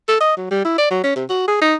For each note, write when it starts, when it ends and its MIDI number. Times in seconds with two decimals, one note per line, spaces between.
0.08 0.18 69
0.20 0.35 75
0.37 0.48 54
0.51 0.61 55
0.65 0.77 64
0.78 0.88 74
0.91 1.03 54
1.04 1.15 61
1.16 1.24 48
1.29 1.47 66
1.47 1.56 68
1.61 1.75 63